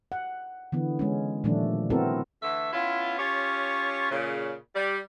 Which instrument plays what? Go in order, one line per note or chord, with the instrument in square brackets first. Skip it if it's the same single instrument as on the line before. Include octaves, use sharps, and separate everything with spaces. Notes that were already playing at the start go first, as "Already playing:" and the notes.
[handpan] F#5
D3 E3 B3
G#3 C#4
A#2 D#3 F3 G3 A3 D4
B3 C4 E4 F#4 A4 A#4
[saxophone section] D3 E3 A3 E5
B3 C#4 E4 F4
C#4 F4 G4 C#5
A#2 C#3
G3